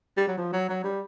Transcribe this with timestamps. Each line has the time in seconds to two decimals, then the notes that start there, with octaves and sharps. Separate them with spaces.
0.17 G3
0.28 F#3
0.38 F3
0.53 F#3
0.69 F#3
0.84 G3